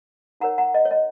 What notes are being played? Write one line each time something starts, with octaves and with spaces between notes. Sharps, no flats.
D#4 A#4 C#5 F#5 A#5
F#5 A#5
D#5
C#5
D#5